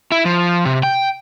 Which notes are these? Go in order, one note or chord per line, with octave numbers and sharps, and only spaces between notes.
E4
F3
C3
G5